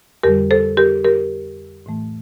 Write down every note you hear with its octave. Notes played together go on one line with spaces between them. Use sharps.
F2 D3 G3 G4 A#4
A4 C5
G4 A#4
G4 A#4
A2 E3 A3